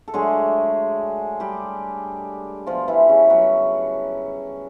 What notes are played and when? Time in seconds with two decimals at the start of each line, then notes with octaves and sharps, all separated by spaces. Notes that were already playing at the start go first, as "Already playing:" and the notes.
0.08 A4
0.14 D3 F#3 G#3 A3 G#4
1.40 G3 G4
2.67 B2 F3 G3 F4
2.88 E3 E4
3.09 C#3 C#4
3.30 F#3 F#4